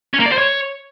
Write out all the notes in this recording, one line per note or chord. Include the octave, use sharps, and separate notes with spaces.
C#4
A#3
D5
C5
C#5